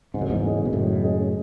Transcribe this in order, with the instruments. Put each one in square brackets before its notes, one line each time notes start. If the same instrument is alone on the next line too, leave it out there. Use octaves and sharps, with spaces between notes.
[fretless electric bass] G#2 [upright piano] C#3
[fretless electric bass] F#2
E2 G#2
[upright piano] G#3 C#4 G#4 D#5
[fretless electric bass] B2
[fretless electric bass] F#2 A2 [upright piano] C#3
[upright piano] G#3 C#4 G#4 D#5